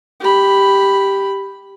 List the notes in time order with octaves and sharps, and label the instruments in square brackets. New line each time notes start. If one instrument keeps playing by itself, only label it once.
[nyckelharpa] G4 B5